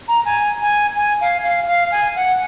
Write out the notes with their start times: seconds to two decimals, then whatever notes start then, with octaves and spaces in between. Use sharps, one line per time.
0.08 A#5
0.25 G#5
0.62 G#5
0.96 G#5
1.21 F5
1.44 F5
1.67 F5
1.92 G#5
2.16 F#5